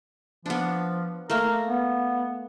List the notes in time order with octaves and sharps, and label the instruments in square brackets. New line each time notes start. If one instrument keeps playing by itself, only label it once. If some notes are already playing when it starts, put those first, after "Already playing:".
[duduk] F3 [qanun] B3 D4
[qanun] A3 A#3 [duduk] A#4
[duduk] B3